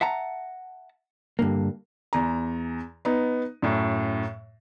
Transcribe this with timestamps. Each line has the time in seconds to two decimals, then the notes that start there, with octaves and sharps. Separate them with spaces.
0.01 E5 F#5 A5 A#5
1.39 G2 D3 A#3
2.13 E2 A#5
3.05 B3 D#4
3.62 F#2 A2